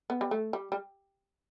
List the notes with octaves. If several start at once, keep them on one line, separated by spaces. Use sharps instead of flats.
B3
G3
A3
G3
G3